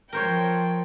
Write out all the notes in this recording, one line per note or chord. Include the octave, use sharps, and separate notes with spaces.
F3 A#4 C5 C#5 G5